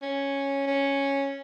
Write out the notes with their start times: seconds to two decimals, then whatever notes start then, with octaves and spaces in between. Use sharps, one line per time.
0.02 C#4
0.67 C#4